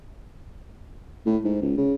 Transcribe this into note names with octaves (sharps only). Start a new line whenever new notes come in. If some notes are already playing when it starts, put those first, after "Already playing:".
A2
G#2
C#2
C#3